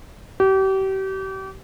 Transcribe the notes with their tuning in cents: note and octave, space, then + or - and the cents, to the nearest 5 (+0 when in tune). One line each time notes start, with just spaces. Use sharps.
G4 -35